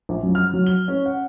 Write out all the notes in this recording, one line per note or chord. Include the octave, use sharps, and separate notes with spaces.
A#1
F#2
F6
F#3
G7
C#4
F#5